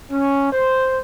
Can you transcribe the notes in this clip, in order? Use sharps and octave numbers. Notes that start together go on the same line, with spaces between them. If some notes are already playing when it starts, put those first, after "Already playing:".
C#4
C5